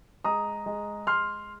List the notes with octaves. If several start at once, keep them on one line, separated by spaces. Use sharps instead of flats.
G#3 A#5 D#6
G#3
G#3 C6 F6